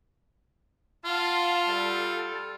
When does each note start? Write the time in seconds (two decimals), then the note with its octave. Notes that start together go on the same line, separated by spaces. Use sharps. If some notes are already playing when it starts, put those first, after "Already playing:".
1.05 F4 F5 F#5 A5
1.69 G3 A4